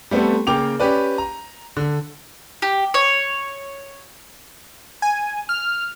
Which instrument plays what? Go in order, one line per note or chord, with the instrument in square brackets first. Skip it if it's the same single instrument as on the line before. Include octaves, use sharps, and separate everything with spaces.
[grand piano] G3 A3 B3 C4 A4
C#3 A#3 G5 D6 F7
C#4 G4 B4 D5
A#5
D3
[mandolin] G4
C#5
[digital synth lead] G#5
F6